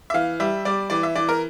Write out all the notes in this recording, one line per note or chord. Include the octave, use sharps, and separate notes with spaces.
E5
E3 F5
G3 E5
G3 D5
E3 D5
E5
E3 D5
A#4